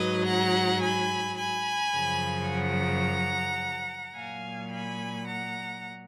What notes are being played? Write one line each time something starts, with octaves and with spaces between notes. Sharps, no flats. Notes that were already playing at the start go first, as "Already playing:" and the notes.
Already playing: G#2 F#3 B4 D#5
F#5 A#5
G#5 B5
G#5 B5
F#2 C#3 F3
F#5 A#5
A#2 F#3 F5 G#5
G#5 B5
F#5 A#5